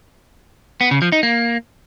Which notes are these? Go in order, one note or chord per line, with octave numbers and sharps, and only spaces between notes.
B3
C#3
F3
D#4
A#3